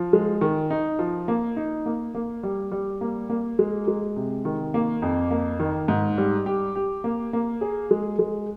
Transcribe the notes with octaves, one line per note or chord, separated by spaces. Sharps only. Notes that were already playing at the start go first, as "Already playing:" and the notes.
Already playing: F3
G#3
D#3
D#4
F3
A#3
D#4
A#3
A#3
G3
G3
A#3
A#3
G#3
G#3
C3
D#3
A#3
F2
A#3
D#3
G#2
G3
G4
G4
A#3
A#3
G#4
G#3
G#3